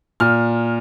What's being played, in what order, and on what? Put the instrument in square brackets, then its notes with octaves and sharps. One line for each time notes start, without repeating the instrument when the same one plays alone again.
[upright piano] A#2 F6